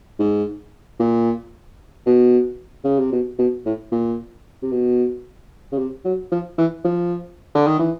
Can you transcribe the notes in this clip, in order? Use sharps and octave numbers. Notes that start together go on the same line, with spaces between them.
G#2
A#2
B2
C#3
C3
B2
B2
A2
A#2
C3
B2
C#3
C3
F#3
F3
E3
F3
D3
D#3
E3